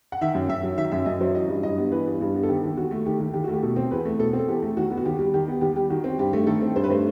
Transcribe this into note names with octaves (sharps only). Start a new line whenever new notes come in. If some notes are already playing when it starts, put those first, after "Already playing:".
F#5
D#3 E5
F#2
F#2 E5
F#3
D#3 E5
F#2 E5
F#2 D#5
F#3 C5
E3 D#5
G2
G2 D#5
B3
E3 B4
G2
G2
B3
A4
D#3 G4
D#2
D#2 F#4
A3
D#3 G4
D#2
D#2 G4
A3 F#4
G4
B2 A4
C4
E2 B4
A3
B2 A4
C4
A4
E2 G4
A3
D#3 F#4
B3
F#4
D#2 G4
G3
D#3 G4
B3
D#2 G4
G3 G4
D#3 F#4
C4
G2 G4
A3
D#3 A4
C4
G2 C5
B4
A3 C5